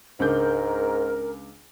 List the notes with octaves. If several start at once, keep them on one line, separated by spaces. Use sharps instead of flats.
C#2 G#2 D4 A#4 G6